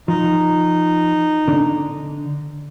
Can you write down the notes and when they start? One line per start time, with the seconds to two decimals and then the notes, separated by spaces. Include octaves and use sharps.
0.08 F3 D#4
1.48 D3 D4